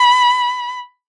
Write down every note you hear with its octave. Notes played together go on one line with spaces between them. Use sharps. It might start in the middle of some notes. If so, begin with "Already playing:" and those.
Already playing: B5